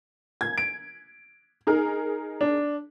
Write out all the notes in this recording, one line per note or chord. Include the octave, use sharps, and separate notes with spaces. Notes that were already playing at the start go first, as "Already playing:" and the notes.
G#6
D7
D#4 G#4 A#4
D4